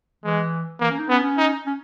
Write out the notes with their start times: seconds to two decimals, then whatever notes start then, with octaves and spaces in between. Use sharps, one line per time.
0.24 E3 G#3
0.80 E3 A#3
0.91 C#4
0.99 D#4
1.09 B3 C#4
1.23 C#4
1.38 D#4
1.66 C#4